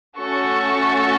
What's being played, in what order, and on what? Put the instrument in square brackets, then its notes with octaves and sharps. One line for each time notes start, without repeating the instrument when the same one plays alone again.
[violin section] A3 C#4 F#4 A4 C#6